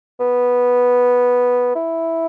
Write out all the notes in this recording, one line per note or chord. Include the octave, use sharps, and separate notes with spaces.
B3
E4